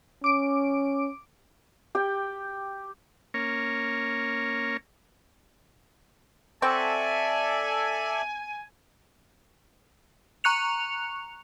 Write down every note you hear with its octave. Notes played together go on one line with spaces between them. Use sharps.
C#4 D6 D7
G4 G5
A#3 C#4 A#4 C#5
C4 F#4 A4 D5 E5 G#5
A#5 C#6 F#6 C#7 F7